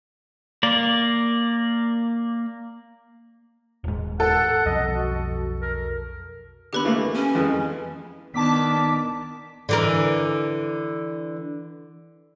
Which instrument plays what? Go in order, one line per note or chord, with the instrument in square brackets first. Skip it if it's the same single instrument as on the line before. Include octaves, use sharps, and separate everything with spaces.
[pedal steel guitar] A#3 D5
[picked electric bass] D#1 G#2
[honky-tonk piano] A4 [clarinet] F#5
[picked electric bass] B1 F2 [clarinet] D#5
[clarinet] F#4
A#4
[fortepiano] D3 B3 [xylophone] G4 B4 B5
[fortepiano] E3 A3 A#3
[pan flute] C#4
[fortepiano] F2 E3 G#3
[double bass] D#3 D4 [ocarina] B3 [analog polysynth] A5 D6 B6
[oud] D3 E3 A#4